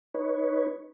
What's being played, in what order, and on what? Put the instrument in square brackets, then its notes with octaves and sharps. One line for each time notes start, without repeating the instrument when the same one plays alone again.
[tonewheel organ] D#4 B4 C#5